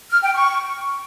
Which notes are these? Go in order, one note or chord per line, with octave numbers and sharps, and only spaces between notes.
F6
G5
C#6